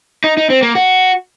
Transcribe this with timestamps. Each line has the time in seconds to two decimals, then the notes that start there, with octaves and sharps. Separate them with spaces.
0.24 D#4
0.37 D#4
0.50 C4
0.63 A#3
0.75 F#4